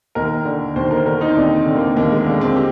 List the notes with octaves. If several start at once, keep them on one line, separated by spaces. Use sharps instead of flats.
D#2 A#4
D3
D#2 C5
A#4
D3 A#4
D#4
C4
D#2 D4
C4
D3
A#3
D#2 A#3
G#3
D3 A#3
C4
G4